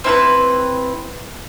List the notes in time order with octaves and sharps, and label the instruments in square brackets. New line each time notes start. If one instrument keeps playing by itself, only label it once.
[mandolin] C4 E4 A#4 B4